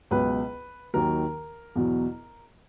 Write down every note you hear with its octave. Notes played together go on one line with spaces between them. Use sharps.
C#2 B2 F#3 B4
D#2 D#3 F#3 A#4
E2 B2 F#3